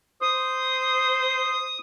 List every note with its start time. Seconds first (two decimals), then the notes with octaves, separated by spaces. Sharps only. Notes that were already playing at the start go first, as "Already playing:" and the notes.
0.22 C5 D#6